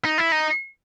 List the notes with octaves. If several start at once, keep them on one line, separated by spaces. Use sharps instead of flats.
D#4
E4
D#4